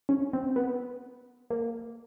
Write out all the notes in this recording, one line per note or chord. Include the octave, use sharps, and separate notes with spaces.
C#4
C4
B3
A#3